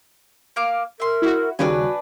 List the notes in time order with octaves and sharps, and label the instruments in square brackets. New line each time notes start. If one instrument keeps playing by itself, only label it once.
[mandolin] A#3 F5 D6
[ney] A#4 [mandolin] E5 C6
[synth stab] E4 F#4
[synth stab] D#2 C#3 G3 [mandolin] D4 B4 G#5 [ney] F#4